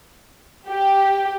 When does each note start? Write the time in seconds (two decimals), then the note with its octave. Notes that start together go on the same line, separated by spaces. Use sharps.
0.68 G4